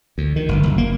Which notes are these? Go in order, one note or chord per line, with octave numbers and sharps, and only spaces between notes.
D2
D#3
G1
F#1
A#3